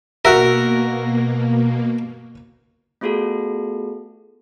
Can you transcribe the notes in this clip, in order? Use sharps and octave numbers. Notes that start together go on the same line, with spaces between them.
B2 A#3 F#4 A#4 E5
A3 B3 F4 F#4 G#4 A4